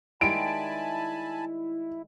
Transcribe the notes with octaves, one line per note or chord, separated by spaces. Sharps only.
D#3 G3 G#3 E4 G#5 A5 B5 D7